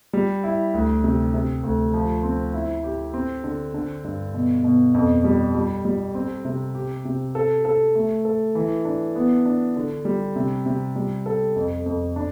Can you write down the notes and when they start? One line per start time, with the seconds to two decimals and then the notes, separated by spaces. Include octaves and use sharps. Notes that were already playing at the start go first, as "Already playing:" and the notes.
0.13 G3
0.44 E4
0.74 D2
1.04 C3
1.34 C3
1.63 D2
1.93 F3
2.23 C4
2.54 E4
2.84 G4
3.14 C4
3.44 D3
3.74 D3
4.04 G2
4.34 B2
4.64 B2
4.94 F2
5.24 G3
5.55 G3
5.85 G3
6.15 C4
6.45 C3
6.75 G4
7.05 C3
7.35 A4
7.65 A4
7.95 A3
8.25 A4
8.55 E3
8.85 D4
9.16 B3
9.46 D4
9.76 D3
10.05 G3
10.36 C3
10.66 C3
10.96 G3
11.26 A4
11.56 F2
11.86 F2
12.16 D4